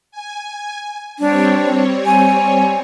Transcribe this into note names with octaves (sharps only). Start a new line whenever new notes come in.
G#5
G3 C4 D4 C#5
G#5